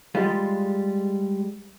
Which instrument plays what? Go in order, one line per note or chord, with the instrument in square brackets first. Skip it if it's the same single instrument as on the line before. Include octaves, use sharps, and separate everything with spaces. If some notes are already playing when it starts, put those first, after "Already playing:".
[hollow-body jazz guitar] G3 G#3 F4